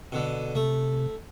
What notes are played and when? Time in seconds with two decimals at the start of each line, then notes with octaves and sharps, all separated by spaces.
0.12 B2 D3
0.55 C3 A3